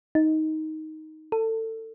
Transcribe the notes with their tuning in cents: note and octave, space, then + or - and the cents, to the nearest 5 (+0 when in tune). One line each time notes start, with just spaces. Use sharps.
D#4 +10
A4 +25